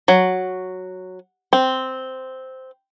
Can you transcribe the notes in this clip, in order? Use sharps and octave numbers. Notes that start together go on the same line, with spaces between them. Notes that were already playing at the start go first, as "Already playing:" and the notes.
F#3
C4